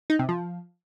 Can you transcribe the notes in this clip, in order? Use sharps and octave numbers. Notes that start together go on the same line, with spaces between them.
D#4
C3
F3